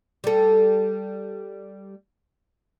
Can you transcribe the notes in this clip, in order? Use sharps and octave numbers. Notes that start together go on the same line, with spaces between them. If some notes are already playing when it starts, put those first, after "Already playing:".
G3 A4